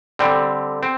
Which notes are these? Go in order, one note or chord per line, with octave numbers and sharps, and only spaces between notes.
D3 G3 C4
C4